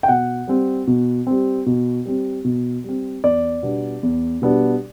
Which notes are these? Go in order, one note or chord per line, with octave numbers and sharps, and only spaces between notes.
G5
B2 F#5
G3 C4
B2
G3 C4
B2
G3 C4
B2
G3 C4
E2 D5
B2 G3 B3 D4
E2
B2 G3 B3 D4